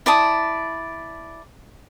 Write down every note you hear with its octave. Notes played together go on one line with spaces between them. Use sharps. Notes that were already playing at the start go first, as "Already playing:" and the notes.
E4 D5 A5 D#6